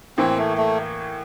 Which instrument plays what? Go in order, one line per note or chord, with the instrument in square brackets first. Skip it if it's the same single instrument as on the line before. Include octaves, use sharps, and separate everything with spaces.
[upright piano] A2 E3 A#3 [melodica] C4
[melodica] A3
A3